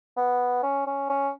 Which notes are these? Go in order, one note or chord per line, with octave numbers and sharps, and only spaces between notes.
B3
C#4
C#4
C#4